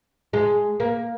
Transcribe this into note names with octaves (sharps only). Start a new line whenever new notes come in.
G#3
A#3